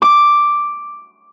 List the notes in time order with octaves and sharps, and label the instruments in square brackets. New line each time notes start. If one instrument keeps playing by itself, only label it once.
[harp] D6